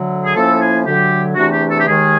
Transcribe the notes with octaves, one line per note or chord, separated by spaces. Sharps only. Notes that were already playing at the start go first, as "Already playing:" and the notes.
Already playing: D2 D3 F#3
G#4
A2 F3 A#3 C#4 E4 A4
G#4
D2 D3 F#3 G4
E2 C3 E3 A3 D4 F#4
G4
A4
G4
D#2 D#3 G#3 G#4